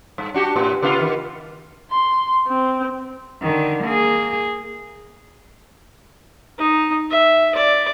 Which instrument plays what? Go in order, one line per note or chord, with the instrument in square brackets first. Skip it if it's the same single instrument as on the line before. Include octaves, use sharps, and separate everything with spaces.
[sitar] G2
D4 F#4 G4
A2
C#3 B3 F4
D#3
[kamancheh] C6
C4
[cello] D3 D#3
A#3 G#4
[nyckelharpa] D#4
E5
D5